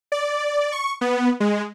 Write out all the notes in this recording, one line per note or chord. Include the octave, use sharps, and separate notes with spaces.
D5
C#6
B3
G#3